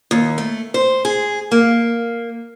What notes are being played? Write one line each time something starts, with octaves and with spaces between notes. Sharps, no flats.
D#2
A3
C5
G#4
A#3